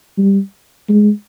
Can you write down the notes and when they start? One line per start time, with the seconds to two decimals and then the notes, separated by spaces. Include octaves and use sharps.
0.18 G3
0.89 G#3